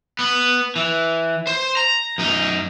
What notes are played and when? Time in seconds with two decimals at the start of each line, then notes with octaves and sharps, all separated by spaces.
0.19 B3
0.76 E3
1.47 C5
1.77 A#5
2.18 F#2 D#4